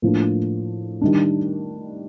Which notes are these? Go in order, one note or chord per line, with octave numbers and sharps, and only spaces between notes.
A2 F3 A#3 D4
D#3 G3 D4